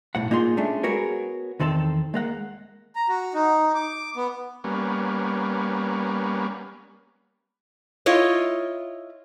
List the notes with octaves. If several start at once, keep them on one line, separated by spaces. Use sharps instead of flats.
B1 A2 F#5
A#3 D#4 F4 G#4 C6
G#3 A3 C#4 D4
B3 F#4 G#4 A#4 C#5
E2 D#3 C4 A4 A5
G#3 A#3 F#5
A#5
F#4
D#4
D6
B3
G3 A#3 B3 C#4
E4 F4 C#5 D#5